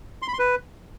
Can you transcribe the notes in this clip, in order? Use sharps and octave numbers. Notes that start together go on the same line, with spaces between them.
C6
B5
C6
B4